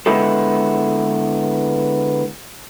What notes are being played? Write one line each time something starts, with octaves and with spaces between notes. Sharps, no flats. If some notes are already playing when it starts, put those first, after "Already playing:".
D3 G#3 B3 E4 G4 A4